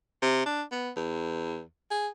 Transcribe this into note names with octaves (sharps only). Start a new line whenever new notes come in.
C3
D4
B3
E2
G#4